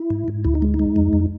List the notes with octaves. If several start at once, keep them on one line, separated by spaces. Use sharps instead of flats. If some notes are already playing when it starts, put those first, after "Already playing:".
Already playing: E4
G#2
G#2
D2 E4
D#4
G#3
D#4
G#3
F2
F2